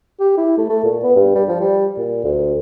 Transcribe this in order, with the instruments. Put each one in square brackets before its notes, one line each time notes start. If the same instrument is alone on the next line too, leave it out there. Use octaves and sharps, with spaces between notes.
[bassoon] G4
E4
A3
A3
A#2
B3
G2
G3
F3
G3
A#2
D2